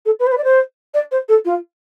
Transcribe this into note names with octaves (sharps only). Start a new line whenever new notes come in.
A4
B4
C5
B4
D5
C5
D5
C5
A4
F4